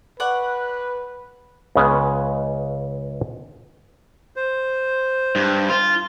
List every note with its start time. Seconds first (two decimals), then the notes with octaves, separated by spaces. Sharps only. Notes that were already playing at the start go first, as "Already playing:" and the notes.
0.20 B4 D5 F#5 C#6
1.75 C#2 C#3 G#3 B3 C#4
4.36 C5
5.36 G2
5.70 F4